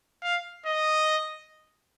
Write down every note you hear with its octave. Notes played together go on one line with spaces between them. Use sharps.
F5
D#5